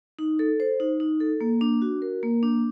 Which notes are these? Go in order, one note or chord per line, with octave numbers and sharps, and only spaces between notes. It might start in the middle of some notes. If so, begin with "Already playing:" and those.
D#4
A4
C5
D#4
D#4
A4
A#3
D4
F#4
A#4
A#3
D4